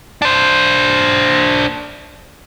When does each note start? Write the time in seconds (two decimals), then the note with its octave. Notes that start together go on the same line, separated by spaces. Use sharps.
0.22 D4 C5